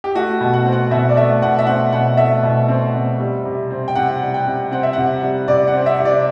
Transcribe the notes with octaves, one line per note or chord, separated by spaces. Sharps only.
G4
A3 F#4
B2
F#5
C4
F#5
B2 E5
D5
A3 E5
B2 F#5
E5
C4 F#5
B2 F#5
A3 E5
B2
C4
B2
G3
C3
C4
G5
C3 F#5
G3
G5
C3
C4 F#5
E5
C3 F#5
G3
C3 D5
F#5
C4
E5
C3
D5